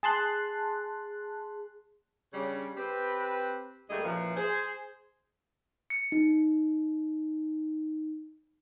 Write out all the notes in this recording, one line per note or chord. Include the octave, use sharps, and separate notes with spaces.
G#4 A5 C6 F#6
C#3 G3 D4
C4 G4 B4
D2 G3 A3 A#3 G#4 D#5
F#2 A#2 E3 F3
G#4 C5
C#7
D#4